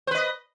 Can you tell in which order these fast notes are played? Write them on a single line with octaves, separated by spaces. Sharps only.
C5 B4 D#5